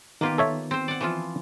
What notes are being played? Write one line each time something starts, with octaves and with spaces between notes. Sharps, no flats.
D#3 A#3 B3 F4 G4
A4 C#5 E5
C4 C5
D5 F#5
E3 F3 F4